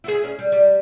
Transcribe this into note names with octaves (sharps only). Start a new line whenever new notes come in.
E4 F4 G#4
C#4
G3
G3